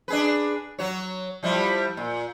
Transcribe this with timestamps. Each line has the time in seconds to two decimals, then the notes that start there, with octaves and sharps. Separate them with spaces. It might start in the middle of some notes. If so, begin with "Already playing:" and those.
0.08 D4 G#4 B4
0.79 F#3 F#4 C#5
1.43 F3 G3 E4
1.97 A#2